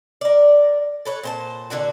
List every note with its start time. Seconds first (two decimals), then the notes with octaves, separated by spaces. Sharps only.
0.21 A#4 D5
1.05 A4 B4 C#5
1.23 A#2 C5 A5
1.70 A#2 D3 D4 F#4